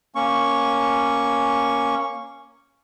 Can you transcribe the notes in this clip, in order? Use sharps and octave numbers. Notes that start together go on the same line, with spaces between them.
A#3 C#4 C#6